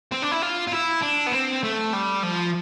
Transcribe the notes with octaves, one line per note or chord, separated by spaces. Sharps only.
C4
D4
E4
F4
F4
E4
D4
B3
C4
A3
G3
F3